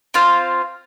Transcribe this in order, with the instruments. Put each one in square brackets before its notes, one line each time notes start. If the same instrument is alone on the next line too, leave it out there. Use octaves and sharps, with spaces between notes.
[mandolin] C4 F4 C5 F5